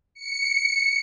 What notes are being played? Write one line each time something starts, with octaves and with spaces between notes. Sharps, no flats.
C#7